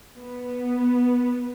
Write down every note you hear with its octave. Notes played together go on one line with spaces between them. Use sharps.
B3